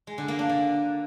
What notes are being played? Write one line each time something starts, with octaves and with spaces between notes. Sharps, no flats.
G#3
D3
A#3
D4
D3